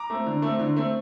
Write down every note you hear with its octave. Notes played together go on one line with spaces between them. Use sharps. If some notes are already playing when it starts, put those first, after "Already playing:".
Already playing: A#5 D6
A3 C4
D3
A3 C4
D3
A3 C4